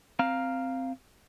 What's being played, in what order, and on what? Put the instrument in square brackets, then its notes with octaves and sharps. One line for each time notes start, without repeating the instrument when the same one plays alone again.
[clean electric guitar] C4 F5 A#5